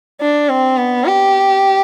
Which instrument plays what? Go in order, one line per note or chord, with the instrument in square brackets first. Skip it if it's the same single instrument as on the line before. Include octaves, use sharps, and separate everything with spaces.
[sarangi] D4
C4
B3
G4